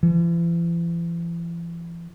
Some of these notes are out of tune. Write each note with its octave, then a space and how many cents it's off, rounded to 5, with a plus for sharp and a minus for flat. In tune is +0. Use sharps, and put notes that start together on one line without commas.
E3 +45